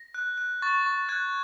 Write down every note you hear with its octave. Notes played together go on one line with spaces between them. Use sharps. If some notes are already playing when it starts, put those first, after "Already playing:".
Already playing: A#6
F#6
F#6
C#6 A6
C#6
F#6 G#6